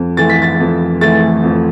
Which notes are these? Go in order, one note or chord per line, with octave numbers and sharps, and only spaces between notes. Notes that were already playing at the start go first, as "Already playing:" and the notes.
Already playing: F2
E3 A3 A6
B6
A6
F2
E3 A3 A6
F2